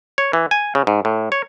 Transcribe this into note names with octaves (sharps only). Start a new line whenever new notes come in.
C#5
E3
G#5
C#3
G#2
A2
C#5